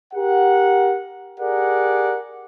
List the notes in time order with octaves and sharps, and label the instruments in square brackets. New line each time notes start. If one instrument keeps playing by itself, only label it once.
[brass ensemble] G4 A#4 F#5
G4 G#4 A#4 D5 F#5